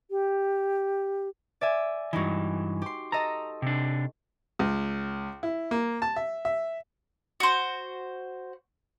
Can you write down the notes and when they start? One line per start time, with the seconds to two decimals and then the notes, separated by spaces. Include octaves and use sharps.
0.11 G4
1.61 D5 E5 G#5
2.13 G2 E3 G#3 D#4 F#4
2.82 G4 C6
3.12 A4 D#5 A#5
3.62 C3 D4
4.59 C#2
5.43 E4
5.71 A#3
6.02 A5
6.16 E5
6.45 E5
7.40 F#4 C5